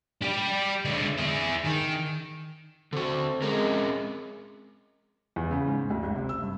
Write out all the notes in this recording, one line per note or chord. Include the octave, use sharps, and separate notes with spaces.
G3 G4
D3 G#3
E4 G#4
D#3
D3 C4 F#4 A4
G#3 C4 C#4 A#4
E2
C#3
G#2
D2
G#1
C3
E6
G2